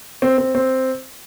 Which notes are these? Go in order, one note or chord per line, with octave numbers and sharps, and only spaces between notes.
C4
C4
C4